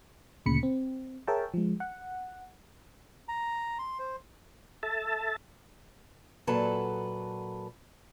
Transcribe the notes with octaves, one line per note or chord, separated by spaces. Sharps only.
D2 A#2 C#3 B5 C#7
C4
G#4 A#4 C#5 E5 G5 A5
F3 G#3
F#5
A#5
C6
C5
A4 E5 A5
A#2 F#3 A4 B4 A5